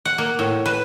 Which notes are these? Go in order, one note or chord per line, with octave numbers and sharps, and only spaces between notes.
F#5
A#3
A2
B4